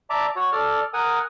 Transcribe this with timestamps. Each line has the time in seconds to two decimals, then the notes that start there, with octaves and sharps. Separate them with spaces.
0.10 D5 E5 A5 A#5 D6
0.36 F#4 C#5
0.53 A4 D5 F6
0.94 A#4 F#5 G#5 D#6